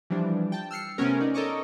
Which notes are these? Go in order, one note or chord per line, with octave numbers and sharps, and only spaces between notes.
E3 F3 G3 D4
G5 A5
E6 F6 C7 C#7
C3 A3 B3 C#4 A#4
D#4 D5
A4 A#4 C#5 D#5 C#6 D6